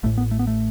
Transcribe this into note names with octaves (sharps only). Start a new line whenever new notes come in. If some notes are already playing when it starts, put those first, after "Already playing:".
A1 A2 A3
B3
A3
B3
A3